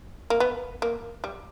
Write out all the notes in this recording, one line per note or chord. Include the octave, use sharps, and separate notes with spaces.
A#3
B3
A#3
G3